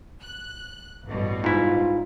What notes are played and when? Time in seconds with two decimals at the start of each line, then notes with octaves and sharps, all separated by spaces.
0.22 F#6
1.06 A1 G2 B2
1.44 G#2 E4 F4